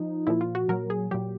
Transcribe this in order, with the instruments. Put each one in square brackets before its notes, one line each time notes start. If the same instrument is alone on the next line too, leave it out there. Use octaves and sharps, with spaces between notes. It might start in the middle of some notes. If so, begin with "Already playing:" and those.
Already playing: [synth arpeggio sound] F3 D#4
A#2 F3 E4
F4
F#4
A#2 F#3 A#4
G#4
A#2 F#3 G4